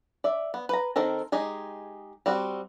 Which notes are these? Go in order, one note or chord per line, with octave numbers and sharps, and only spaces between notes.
D5 E5
B3
B4 A#5
D#3 C4 A4 A#4
G#3 D#4 G4 G#4
G3 C4 F#4